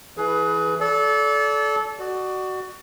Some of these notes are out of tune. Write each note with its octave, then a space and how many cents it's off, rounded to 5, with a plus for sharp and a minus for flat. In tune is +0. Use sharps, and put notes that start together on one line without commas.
E3 +5 G#4 +30 B4 +0
A4 -25 D5 -30
F#4 +15 D5 +35